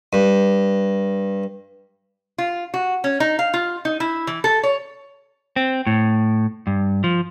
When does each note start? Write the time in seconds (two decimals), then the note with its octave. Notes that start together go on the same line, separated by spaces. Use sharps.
0.13 G2
2.38 F4
2.74 F#4
3.04 C#4
3.20 D#4
3.39 F5
3.54 F4
3.85 D#4
4.00 E4
4.27 E3
4.44 A4
4.63 C#5
5.56 C4
5.87 A2
6.67 G2
7.04 F3